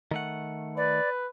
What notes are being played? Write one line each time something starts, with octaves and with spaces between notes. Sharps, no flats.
D#3 A3 F#5
B4 D5